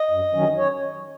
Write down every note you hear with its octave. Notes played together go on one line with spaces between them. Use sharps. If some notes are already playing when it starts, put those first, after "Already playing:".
Already playing: D#5
F#2
D#3 F#3 C#4
C#5